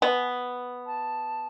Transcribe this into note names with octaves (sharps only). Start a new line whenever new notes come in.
B3 G#5
A5